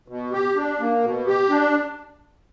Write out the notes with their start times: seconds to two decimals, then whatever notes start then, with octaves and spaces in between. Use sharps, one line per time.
0.08 B2
0.32 G4
0.56 D4
0.80 A#3
1.04 B2
1.27 G4
1.50 D4